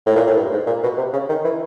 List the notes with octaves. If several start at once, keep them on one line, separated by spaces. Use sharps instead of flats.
A2
A#2
A2
G2
G#2
A#2
B2
C3
C#3
D#3
E3